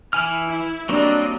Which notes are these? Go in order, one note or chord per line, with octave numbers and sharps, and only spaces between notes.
E3 E4 G#5 F6
E4
F#3 G3 A#3 C4 D4 D#5